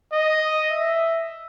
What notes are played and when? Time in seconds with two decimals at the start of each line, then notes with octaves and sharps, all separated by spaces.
0.13 D#5
0.71 E5